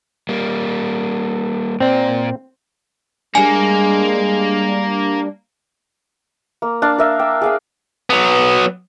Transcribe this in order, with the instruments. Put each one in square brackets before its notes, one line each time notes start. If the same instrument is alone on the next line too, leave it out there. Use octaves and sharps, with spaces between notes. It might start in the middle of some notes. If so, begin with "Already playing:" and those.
[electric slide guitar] G3 A#3
[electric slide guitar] A#2 D5 [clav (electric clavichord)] C4
[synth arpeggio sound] G3 D4 [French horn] G#3 [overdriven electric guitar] A#3 [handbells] G#5
[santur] A#3
D4 F5
A#4 E5 F5
G5
G#4 F5 G5
[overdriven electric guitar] F#3 B3